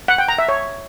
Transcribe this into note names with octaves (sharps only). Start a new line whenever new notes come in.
F#5
G5
A#5
E5
C#5